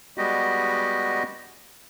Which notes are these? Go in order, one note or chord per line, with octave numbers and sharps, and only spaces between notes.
G3 G#3 B3 F#4 G4 D#5